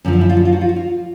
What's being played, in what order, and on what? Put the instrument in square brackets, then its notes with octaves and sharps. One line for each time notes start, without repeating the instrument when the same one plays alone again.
[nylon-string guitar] F#2 D3 F3 C#4
D4
E4
F4
F#4
F4
F#4
F4
F#4
F4